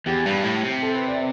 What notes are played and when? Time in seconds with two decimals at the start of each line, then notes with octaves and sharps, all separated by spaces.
0.07 E2 G4
0.26 G2
0.44 A2
0.63 C3
0.83 A4
0.95 B4
1.08 D5